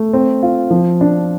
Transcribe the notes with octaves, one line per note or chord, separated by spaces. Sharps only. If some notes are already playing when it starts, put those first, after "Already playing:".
Already playing: A3
C4
F4
F3
D4